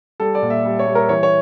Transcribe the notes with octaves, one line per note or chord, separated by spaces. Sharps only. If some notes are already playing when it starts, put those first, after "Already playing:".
G3 A4
D5
A#2
E5
G3
C#5
G3
A#4
E3 C#5
C#5